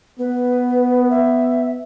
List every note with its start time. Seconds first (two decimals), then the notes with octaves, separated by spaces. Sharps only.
0.19 B3 B4
1.10 E5